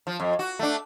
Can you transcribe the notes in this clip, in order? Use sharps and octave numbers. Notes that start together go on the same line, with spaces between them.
F3
F2
F#4
A3 D4